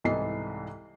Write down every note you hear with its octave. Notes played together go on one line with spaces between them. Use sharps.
C2 G#2 E3 A4 D#5 C7